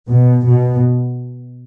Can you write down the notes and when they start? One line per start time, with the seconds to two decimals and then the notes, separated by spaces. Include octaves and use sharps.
0.09 B2
0.45 B2